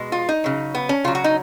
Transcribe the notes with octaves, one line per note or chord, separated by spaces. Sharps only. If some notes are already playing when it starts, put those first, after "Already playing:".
Already playing: B2 G#3
F4
D#4
C#3 F#3
B3
C#4
C#3 F#3 F4
F#4
D#4